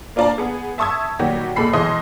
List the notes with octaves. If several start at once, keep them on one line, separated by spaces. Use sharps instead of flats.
A#3 D4 F4 D5 A5 A#5
B3 G#4
E5 A5 C#6 D#6 E6 G#6
A#2 D#3 F#3 G3 F#4 G4
B1 A#2 G#3 A4 B5 C7
B1 E3 G#3 D#5 C6 D#6